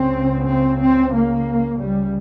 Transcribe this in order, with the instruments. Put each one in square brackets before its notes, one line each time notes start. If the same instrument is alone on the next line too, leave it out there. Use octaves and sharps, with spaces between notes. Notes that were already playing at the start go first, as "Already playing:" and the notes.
Already playing: [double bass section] C#2 C#3 C4
C4
C4
A#3
C#2 C#3 G3